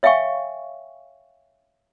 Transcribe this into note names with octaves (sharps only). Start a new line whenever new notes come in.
C#5 E5 F5 G5 G#5 C#6